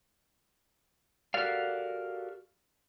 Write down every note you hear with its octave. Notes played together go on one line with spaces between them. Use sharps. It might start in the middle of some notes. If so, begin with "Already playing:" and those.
F#4 G4 A4 A#4 D5 F5